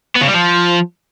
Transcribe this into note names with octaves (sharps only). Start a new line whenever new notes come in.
B3
C#3
G3
F3